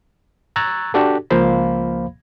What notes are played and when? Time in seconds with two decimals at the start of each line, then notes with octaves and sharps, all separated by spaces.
0.56 A#5 C#6 E6 F#6 G#6 A6
0.94 D4 F#4 G4 A4
1.30 C#2 F3 A#3 C5 F5 B5